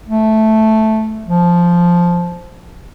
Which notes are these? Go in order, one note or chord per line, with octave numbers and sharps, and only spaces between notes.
A3
F3